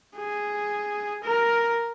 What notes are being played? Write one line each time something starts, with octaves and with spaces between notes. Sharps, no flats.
G#4
A#4